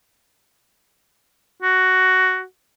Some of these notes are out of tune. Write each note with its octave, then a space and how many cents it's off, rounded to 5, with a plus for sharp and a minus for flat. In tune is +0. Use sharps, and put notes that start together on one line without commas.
F#4 +10